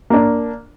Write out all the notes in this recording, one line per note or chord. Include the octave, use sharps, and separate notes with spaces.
A#3 D4